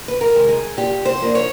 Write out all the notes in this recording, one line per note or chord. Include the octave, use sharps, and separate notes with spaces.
B4
A#4
C3 D#3 G#3
G#4
A#2 G4
C5
F3 A#3 D4
C#5